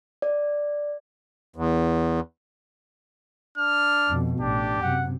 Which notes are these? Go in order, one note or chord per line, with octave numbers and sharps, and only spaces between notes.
D5
E2
D4 F6
F2 B2
A1 D4 G4
F#2 C3 F#5